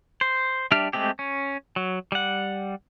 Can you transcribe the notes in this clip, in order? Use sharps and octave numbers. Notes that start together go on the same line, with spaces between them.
C5
G3 D4 G4 E5 F6
G#3 A3 C4 G4
C#4
F#3
G3 F#5